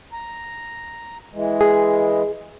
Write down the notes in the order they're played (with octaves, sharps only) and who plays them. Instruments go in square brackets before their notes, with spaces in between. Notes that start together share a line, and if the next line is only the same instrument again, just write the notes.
[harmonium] A#5
E3 G#3
[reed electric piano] G#4